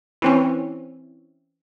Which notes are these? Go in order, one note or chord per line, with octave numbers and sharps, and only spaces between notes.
E3 C4 C#4